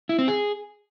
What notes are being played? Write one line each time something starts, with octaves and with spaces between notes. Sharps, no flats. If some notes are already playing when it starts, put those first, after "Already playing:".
E4
C4
G#4